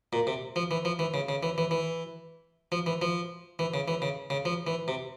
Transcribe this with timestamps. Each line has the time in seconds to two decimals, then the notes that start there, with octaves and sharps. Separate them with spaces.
0.13 A#2
0.27 C3
0.56 F3
0.71 E3
0.85 F3
0.99 E3
1.14 C#3
1.29 C#3
1.43 E3
1.58 E3
1.71 E3
2.72 F3
2.86 E3
3.02 F3
3.59 E3
3.74 C#3
3.88 E3
4.02 C#3
4.30 C#3
4.45 F3
4.67 E3
4.88 C3